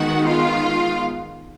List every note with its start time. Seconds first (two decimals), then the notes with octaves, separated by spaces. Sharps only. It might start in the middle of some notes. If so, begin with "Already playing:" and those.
Already playing: D#3 G#3 B3 D#4 F#4 F#5
0.26 F4 F5